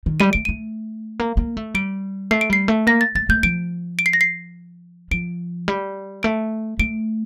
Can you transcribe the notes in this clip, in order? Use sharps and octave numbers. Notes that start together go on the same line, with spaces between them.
D#3
G3 D#7
A3 D7
A3 D#7
A#3
A#3
A3
G3 D7
A3 C7
D7
G3 C7
A3
A#3 A#6
A6
A3 A6
A3 G6
F3 D7
D7
C7
A#6
C7
F3 D7
G3
A3 D7
A3 D7